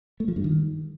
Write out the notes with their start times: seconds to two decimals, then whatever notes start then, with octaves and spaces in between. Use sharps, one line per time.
0.20 A3
0.28 F3
0.36 G2
0.44 D#3